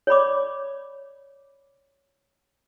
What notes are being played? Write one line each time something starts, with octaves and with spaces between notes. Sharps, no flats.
C#5 D5 B5 D6